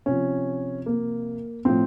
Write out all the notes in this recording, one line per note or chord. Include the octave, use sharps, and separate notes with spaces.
C3 F3 C#4
A#3
A2 F3 C4